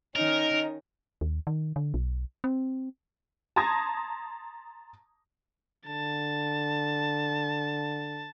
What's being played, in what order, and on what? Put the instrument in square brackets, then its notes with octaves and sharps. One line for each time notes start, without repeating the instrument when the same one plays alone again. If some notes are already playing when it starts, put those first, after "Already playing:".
[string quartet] D#3 C#4 D#4 [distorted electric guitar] A#4 [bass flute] D#5
[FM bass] D#2
D#3
D3
B1
C4
[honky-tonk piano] A5 A#5 C6 D#6 G#6 A#6
[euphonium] D3 [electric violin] A5